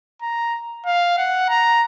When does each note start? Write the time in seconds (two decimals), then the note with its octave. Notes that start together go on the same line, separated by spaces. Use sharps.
0.22 A#5
0.86 F5
1.18 F#5
1.49 A#5